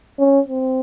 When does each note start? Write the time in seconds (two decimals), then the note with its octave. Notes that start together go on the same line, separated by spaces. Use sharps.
0.19 C#4
0.48 C4